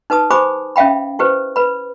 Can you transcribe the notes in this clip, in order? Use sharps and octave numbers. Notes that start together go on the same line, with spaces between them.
D#4 B4 A5 D#6
G4 C5 G#5 B5 D6 D#6
C#4 E5 F5 G5 B5
E4 G4 B4 C5
B4 B5